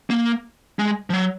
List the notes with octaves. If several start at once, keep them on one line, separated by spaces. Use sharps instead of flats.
A#3
G#3
F3
F#3